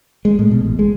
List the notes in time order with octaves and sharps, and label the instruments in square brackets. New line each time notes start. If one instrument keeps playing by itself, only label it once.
[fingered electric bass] G#3
A2
B2
A1
G#3